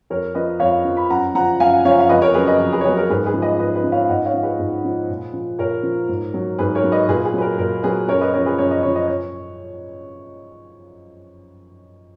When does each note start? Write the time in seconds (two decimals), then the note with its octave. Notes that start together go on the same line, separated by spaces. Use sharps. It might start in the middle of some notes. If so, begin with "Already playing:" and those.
0.10 F2 A#4 C#5
0.35 F3 B4 D#5
0.60 F2 C#5 F5
0.85 F3
0.97 B5
1.10 F#2 F#5 A#5
1.35 C#3 F3 F#5 A#5
1.60 F#2 F5 G#5
1.85 C#3 F3 C#5 F5
2.00 F5
2.09 F2 B4 D#5
2.22 A#4 C#5
2.34 C#3 F#3 G#4 B4
2.47 B4 D#5
2.60 F2
2.72 G#4 B4
2.81 C#5
2.84 C#3 G#4 B4
2.89 F#3
2.97 A#4
3.09 G#2 G#4 B4
3.25 G#4 B4
3.34 F3
3.42 B4 D#5
3.59 G#2 B4 D#5
3.76 B4 D#5
3.84 F3
3.92 C#5 F5
4.09 G#2 D#5 F#5
4.25 C#5 F5
4.34 F3
4.43 G#4 B4
4.59 G#2
4.85 F3
5.10 A#2
5.33 F3
5.59 A#2 A#4 C#5
5.83 F3
6.09 G#2
6.34 F#3
6.59 G#2 G#4 B4
6.75 A#4 C#5
6.84 F#3
6.92 B4 D#5
7.08 A#2 G#4 B4
7.25 G#4
7.33 F#3 B4
7.41 A#4
7.58 A#2 A#4
7.83 F#3 G#4 B4
8.08 F#2 A#4 C#5
8.21 B4 D#5
8.34 C#3 A#4 C#5
8.38 F3
8.46 G#4 B4
8.58 F#2 C#5
8.71 D#5
8.83 C#3 F3 C#5
8.95 D#5
9.08 C#5